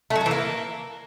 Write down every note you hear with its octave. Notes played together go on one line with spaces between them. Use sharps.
A3
F#3
A3
E3
A#3